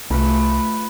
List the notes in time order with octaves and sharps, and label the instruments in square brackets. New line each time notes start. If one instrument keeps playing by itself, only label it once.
[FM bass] C2 [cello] A3 [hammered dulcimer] F4 B4 B5